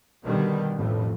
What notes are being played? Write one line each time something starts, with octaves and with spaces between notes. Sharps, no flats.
B2 D3 D#3 G3
A1 F2 A2